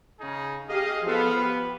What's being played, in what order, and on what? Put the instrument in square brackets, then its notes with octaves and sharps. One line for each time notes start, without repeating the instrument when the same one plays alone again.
[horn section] C#3 D#4 G#4
[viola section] G4 G#4 F5 [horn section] D#5
[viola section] F3 F5 [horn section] B3 [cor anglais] A4
[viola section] G4 [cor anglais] B4